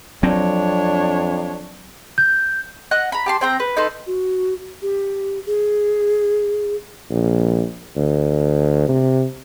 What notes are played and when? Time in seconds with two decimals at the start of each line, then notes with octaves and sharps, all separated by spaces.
0.23 F2 F#3 C4 D4 C#5
2.18 G6
2.91 D#5 F#5 F#6
3.12 A#5 B5
3.26 G4 A5 C6
3.41 C4 G5 A#5
3.60 B4
3.77 D#4 A4 B4 C6
4.07 F#4
4.82 G4
5.46 G#4
7.10 A#1
7.96 D2
8.88 C3